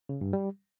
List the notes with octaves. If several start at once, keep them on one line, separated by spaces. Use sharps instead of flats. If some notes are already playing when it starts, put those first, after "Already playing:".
C#3
G2
G3